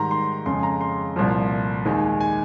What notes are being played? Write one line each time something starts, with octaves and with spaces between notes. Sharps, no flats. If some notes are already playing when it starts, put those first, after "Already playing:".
Already playing: G#2 D#3 G3 A#5 C6
C6
F2 C#3 G#3 C6
A#5
C6
C2 A#2 F3
D#2 D#3 G#3
G#5